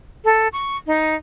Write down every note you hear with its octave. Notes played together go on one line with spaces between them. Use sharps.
A4
C#6
D#4